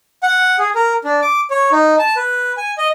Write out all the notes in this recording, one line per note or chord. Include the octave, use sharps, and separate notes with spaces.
F#5
G#4
A#4
D4
D6
C#5
D#4
A5
B4
G#5
D#5